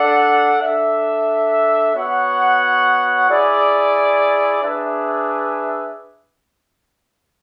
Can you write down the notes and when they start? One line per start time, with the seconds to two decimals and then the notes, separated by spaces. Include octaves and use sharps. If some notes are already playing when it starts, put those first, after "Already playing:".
Already playing: D4 A4 D5 F#5
0.60 D4 A4 E5
1.94 B3 F#4 C#5 F#5
3.28 E4 G#4 D5
4.62 D4 G#4 B4 E5